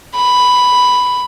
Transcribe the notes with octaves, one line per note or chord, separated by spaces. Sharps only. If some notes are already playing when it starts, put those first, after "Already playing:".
B5